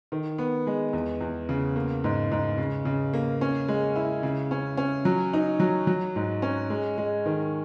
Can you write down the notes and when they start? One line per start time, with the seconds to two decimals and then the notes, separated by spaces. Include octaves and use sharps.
0.12 D#3
0.38 B3
0.67 G#3
0.93 E2
1.21 E2
1.49 C#3
1.76 A#3
2.04 G#2
2.32 G#2
2.58 C#3
2.85 C#3
3.14 A#3
3.41 C#4
3.68 G#3
3.96 E4
4.23 C#3
4.51 C#4
4.77 C#4
5.05 F#3
5.33 D#4
5.60 F#3
5.87 F#3
6.16 G#2
6.42 C#4
6.70 G#3
6.98 G#3
7.26 D#3